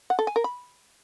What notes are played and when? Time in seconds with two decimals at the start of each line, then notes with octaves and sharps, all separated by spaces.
0.10 F#5
0.19 A4
0.27 G#5
0.36 A#4
0.44 B5